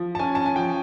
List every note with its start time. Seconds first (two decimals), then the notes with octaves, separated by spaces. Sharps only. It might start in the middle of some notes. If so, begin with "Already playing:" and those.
Already playing: F3
0.15 A5
0.19 C#4 G#5
0.35 A5
0.46 G#5
0.56 F3 G5